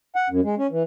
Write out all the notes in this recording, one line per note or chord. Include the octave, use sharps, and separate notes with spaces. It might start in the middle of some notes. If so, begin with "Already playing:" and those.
F#5
F#2
G#3
C#4
E3